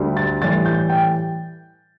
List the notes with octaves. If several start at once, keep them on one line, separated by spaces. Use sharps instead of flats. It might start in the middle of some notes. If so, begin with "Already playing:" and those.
Already playing: D2 D3 G3
A6
A2 E3 G3 A6
G6
G5